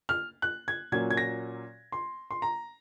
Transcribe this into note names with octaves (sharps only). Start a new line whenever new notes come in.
F6
F#6
G#6
A#2 F#3 A#3 C#4 G#6
G#6
A#6
C6
C6
A#5